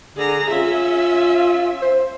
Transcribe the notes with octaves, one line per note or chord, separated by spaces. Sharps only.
D3 G#4 A#5
C#4 F4 E5
C5